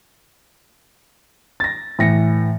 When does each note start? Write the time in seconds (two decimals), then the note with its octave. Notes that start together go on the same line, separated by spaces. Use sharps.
1.60 A6 A#6
1.99 A2 E3 A#6 C#7